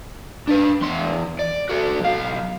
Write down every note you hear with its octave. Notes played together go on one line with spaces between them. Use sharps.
D4 B4
E2 C6
D5
F#4 A4
B1 F5